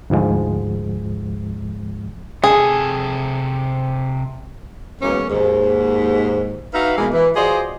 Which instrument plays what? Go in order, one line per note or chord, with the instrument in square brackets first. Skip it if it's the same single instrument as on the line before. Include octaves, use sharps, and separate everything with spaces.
[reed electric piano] D2 G#2 F3 G#3
[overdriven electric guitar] C3 A4 [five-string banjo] G#4
[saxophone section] F#2 E3 G#3 A#3 B3 C#4
D#2 G#2
D#4 F#4 B4 E5 F5
B2 E3 G#3 A#3
E3
F4 F#4 G#4 C5 D5 D#5